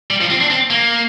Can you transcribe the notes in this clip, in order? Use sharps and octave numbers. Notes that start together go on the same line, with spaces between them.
G3
F3
C4
D4
C4
A#3